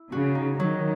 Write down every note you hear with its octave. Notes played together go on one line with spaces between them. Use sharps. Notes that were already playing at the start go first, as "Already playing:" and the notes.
Already playing: E4
C#3 F#4
D#4
D#3 F#3